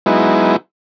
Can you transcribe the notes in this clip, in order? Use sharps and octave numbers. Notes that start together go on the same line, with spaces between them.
F#3 G#3 B3 D#4 E4